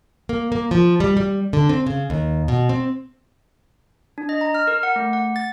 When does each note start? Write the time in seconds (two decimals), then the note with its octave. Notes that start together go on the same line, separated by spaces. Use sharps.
0.29 A#3
0.52 A#3
0.71 F3
1.00 G3
1.17 G3
1.53 D3
1.69 C4
1.86 C#3
2.10 D#2
2.48 B2
2.69 C4
4.18 D4
4.29 D#5
4.41 A#5
4.55 F6
4.67 A#4
4.83 F#5
4.96 A3
5.13 F#5
5.36 A6